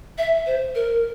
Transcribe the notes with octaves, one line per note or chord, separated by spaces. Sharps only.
E5
C5
A#4